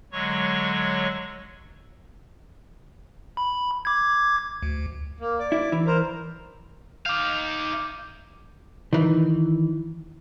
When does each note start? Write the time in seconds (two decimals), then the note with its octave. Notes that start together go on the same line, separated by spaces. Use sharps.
0.12 D3 F#3 G#3 C#5 C#6
3.37 B5
3.85 D6 G#6
4.63 D2
5.20 A#3
5.39 D5
5.52 E4
5.72 E3
5.87 A#4 C5
7.06 D#4 F5 D6 G6
8.93 D#3 E3